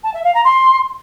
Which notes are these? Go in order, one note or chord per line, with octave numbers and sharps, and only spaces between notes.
A5
E5
F5
A#5
C6